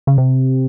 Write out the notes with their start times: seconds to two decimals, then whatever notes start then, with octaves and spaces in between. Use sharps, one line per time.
0.07 C#3
0.18 C3